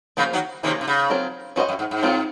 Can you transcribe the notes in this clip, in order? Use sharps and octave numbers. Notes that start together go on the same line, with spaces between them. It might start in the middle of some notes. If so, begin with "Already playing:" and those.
C#3 F3 A#3 F4 C5
D#3 F#3
C3 D#3 F3 A#3 C#4 F4 G#4
C3
C#3
F#3 C4 F4 A#4
F#2 C#4 F#4 C5 D#5
F#2
G#2
G#2
F#3 C4 F4 A#4